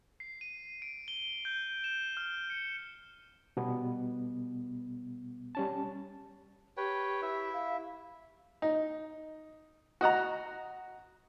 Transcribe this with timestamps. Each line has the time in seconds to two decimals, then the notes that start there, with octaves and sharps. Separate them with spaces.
0.20 C7
0.41 D#7
0.82 D7
1.08 G7
1.45 G6
1.84 E7
2.17 F6
2.50 C#7
3.57 B2 G3 B3
5.55 G3 C#4 A5
6.77 G4 B4 C#5 G5
7.22 E4 E5
7.53 F5
8.62 D#4
10.01 F#4 D#5 F#5 A#5